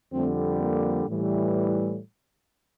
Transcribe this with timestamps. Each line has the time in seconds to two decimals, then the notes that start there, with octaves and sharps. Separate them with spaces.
0.12 F2 D3 G3 A3 C4
0.59 A#3
1.07 A2 E3 G3